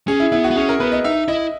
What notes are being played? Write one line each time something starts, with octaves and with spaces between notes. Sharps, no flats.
C#4 G#4
E4
B3 E4
F#4
B3
C#4 G#4
A#4
B3 B4
D#5
D#4 E5
E4 D#5